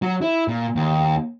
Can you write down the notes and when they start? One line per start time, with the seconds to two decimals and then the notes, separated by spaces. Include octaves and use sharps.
0.02 F#3
0.22 E4
0.48 A#2
0.76 D#2